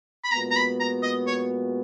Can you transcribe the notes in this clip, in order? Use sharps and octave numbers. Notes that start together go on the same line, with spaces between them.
B5
A#2 G#3 B3 F#4 A#5
A#5
B5
A#5
D#5
C#5